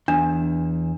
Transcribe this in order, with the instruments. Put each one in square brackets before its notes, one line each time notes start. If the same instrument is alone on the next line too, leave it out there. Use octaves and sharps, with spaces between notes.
[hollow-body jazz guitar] E2 [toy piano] D4